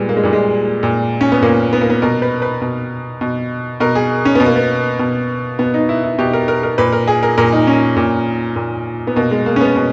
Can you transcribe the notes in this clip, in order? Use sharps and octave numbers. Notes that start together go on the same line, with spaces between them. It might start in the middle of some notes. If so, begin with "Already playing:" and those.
Already playing: A#2 G3 G#3 B3
A#3
G#3
A#2 G3
G#3
A#2
C#4
B3
A#2 A#3
B3
A#3
B3
B2 A#4
B4
B4
B2
B2
B2 A#4
G#4
C#4
B2 B3
A#3
B3
B2
B2 B3
D#4
E4
E4
B2 G4
A#4
A#4
A#4
A#2 B4
A#4
G#4
A#4
A#2 A#4
D#4
C#4
A#2
A#2
B3
B2 A#3
G#3
A#3
C#4
B3
B2